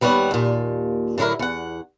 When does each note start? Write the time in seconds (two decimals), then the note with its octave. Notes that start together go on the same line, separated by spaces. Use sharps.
0.01 D#2 G3 B3 C#5 F#5
0.31 D#2 A#2
1.18 A2 D3 F#3 E4 A#4
1.39 E2 F#5